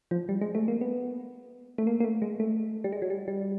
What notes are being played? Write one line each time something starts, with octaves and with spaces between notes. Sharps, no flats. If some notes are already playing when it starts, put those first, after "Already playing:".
F3
G3
G#3
A3
A#3
B3
A3
A#3
A#3
A3
G#3
A3
G3
G#3
F#3
G3
G3